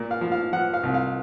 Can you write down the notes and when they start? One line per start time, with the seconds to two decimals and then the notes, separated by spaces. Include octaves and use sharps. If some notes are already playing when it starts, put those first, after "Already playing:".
Already playing: A#2
0.11 F5
0.21 F3
0.32 F5
0.53 F3 F#5
0.74 F5
0.83 C2
0.94 F5